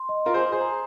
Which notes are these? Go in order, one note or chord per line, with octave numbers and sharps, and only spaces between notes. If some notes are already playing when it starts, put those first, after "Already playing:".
Already playing: C6
D#5
F4 A#4 C6
G#4 C5
G#5
G#4 C5
A#5